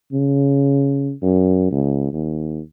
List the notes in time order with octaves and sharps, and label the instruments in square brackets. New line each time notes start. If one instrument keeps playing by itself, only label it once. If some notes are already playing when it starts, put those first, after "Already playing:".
[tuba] C#3
F#2
C#2
D#2